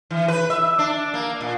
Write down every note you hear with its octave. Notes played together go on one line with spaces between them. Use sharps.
E3
B4
E5
D4
A#3
A#2